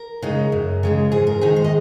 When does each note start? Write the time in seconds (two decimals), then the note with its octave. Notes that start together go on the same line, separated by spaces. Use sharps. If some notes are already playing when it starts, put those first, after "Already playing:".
Already playing: A#4
0.22 C#3 G#3 D#4
0.52 F#2
0.83 C#3 G#3 D#4
1.12 G#2 G#4
1.27 A#4
1.41 D#3 G#3 D#4 G#4
1.56 C5
1.64 D#5